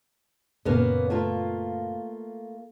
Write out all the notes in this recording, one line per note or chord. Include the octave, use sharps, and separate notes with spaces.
F#2 A#2 C#3 A#3 B3 C#4
A3 A#3 F4